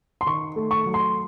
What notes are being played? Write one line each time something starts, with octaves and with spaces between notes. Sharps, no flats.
C6
D#3 C#6
A3
C#6
F#3
C6